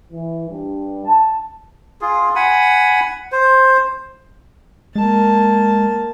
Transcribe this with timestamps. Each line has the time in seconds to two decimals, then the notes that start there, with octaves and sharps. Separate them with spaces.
0.12 E3
0.48 G2
1.05 A5
2.01 F4 G#4
2.35 F#5 G#5 B5
3.32 C5
4.95 G#3 A#3 A5